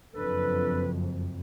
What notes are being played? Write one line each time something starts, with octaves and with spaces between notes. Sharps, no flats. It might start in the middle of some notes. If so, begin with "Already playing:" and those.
F#1 F2 D4 A4 B4